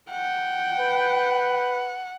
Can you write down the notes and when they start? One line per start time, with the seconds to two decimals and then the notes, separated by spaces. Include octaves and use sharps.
0.11 F#5 G5
0.79 B4